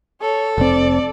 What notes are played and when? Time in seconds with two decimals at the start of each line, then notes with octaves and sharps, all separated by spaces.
0.21 A4 C#5
0.58 F1 C4 D5